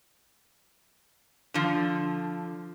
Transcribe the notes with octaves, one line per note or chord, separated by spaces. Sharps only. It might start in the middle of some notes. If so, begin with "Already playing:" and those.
D3 F3